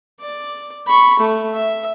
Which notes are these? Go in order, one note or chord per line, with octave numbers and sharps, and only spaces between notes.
D5
B5 C#6
A3
E5